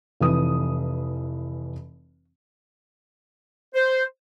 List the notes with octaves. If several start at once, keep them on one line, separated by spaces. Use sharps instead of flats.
F1 E3 D#6
C5